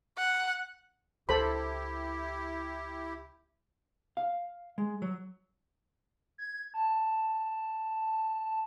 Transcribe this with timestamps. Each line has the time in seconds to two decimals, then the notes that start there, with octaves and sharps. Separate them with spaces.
0.18 F#5
1.29 C#2 E4 G4 A4 C5 B5
4.17 F5
4.78 G#3
5.02 F#3
6.38 G#6
6.74 A5